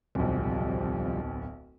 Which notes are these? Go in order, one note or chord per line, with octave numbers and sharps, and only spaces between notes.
D1 B1 C3 F3 G3